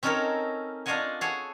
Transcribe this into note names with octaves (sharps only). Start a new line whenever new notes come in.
C4 C#4 D#4 A4 A#4 C#5
D4 F4 C#5 D#5 F#5 G#5
G#4 A4 C#5 F#5